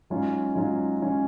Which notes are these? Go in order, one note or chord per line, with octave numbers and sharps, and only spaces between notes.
G#2 F#3 C#4 F4
G#2 F#3 C#4 F4
F#3 C#4 F4